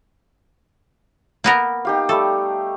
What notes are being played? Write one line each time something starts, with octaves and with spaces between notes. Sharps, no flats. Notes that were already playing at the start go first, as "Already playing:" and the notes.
A#3 B3 A#4
D#4 G4 F5
G3 A3 A4